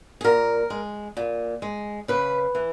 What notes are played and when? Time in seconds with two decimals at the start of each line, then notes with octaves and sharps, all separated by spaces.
0.21 G#4
0.24 A#2 A#4
0.70 G#3
1.17 A#2
1.62 G#3
2.08 C#3 B4
2.55 E3